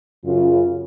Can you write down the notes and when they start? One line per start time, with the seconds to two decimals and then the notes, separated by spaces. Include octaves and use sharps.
0.24 F#2 C#3 F4